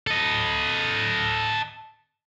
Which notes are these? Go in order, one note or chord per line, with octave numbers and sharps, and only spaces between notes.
A4 D#5